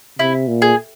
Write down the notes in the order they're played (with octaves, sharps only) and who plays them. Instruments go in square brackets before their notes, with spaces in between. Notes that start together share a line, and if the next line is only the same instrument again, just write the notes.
[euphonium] C3 [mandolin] E4
[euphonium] A#2
[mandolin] G#4